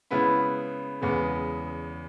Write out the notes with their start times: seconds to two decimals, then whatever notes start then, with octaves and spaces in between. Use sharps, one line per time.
0.11 C#3 G#3 B3 E4 B4
1.02 E2 C#3 G#3 B3